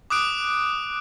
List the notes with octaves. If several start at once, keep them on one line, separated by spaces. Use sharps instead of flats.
D6 D#6 F#6 D7